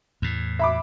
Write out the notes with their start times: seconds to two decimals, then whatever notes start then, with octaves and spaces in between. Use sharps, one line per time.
0.22 E2 A2
0.59 E5 B5 D6